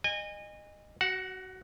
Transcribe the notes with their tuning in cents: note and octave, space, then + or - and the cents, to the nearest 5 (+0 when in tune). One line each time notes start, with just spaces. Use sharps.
D#5 -25 G#5 -30
F#4 +20 F#5 -15